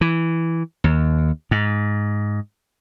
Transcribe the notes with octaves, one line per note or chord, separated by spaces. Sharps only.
E3
D#2
G#2